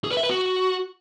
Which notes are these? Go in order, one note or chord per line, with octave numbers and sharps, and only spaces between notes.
G#4
B4
E5
B4
F#4